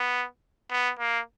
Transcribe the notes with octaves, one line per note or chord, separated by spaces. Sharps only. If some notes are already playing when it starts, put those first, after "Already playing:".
Already playing: B3
B3
A#3